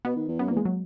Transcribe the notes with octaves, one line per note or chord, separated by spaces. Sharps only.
B2 B3
D#3
E2
F#2 B3
E2 A#3
G#3
F#3